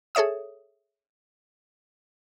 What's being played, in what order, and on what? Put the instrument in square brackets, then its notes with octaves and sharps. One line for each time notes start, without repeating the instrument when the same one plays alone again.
[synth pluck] G#4 A4 C#5 E5 D#6